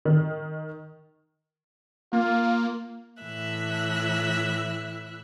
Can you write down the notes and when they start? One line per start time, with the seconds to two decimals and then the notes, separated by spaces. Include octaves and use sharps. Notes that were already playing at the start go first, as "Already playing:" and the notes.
0.05 D#3
2.13 A#3 F4
3.22 A2 E3 E4 E5 F#6